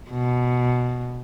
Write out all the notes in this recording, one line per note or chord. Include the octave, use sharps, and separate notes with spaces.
B2